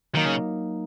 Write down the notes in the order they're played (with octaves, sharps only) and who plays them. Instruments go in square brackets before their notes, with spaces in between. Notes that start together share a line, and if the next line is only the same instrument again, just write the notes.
[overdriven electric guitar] D#3 [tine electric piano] F#3 A#3 D#4
[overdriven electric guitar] C#3